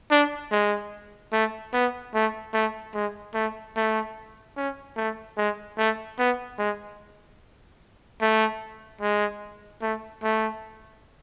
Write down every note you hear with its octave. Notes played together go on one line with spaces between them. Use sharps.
D4
G#3
A3
B3
A3
A3
G#3
A3
A3
C#4
A3
G#3
A3
B3
G#3
A3
G#3
A3
A3